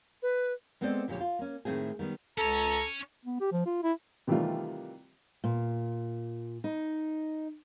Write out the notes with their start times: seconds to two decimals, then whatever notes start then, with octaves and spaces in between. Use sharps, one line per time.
0.22 B4
0.81 G#3 B3 C4 A4 C5 D5
1.08 D2 A#2 D3 F3 G4 C#5
1.20 F4
1.39 A#3 C#4
1.65 A2 D#3 E3 A3 C4 G#4
1.99 D#3 G3 B3
2.38 C#2 C#4 A4 C#5 A#5
3.25 B3
3.40 G4
3.52 F3
3.66 F4
3.83 E4
4.27 C3 D#3 E3 G3 A3 F4
5.44 A#2
6.64 D#4